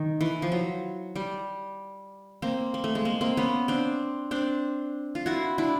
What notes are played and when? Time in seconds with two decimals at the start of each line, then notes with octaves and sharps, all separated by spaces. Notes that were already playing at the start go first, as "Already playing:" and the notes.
Already playing: D#3
0.21 E3
0.42 F3
0.52 F#3
1.16 G3
2.42 A#3 C4
2.74 A#3
2.84 A3
2.95 G#3
3.05 A#3
3.21 A#3 C4
3.37 B3 C#4
3.68 C4 D4
4.31 C4 D4
5.15 F4
5.26 E4 F#4
5.58 D4 E4